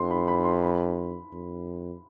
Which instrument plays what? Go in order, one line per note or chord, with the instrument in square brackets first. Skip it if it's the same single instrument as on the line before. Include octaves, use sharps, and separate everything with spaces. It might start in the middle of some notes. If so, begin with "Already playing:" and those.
Already playing: [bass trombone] F2 [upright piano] C6
[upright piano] B5
B5
C6
B5
[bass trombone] F2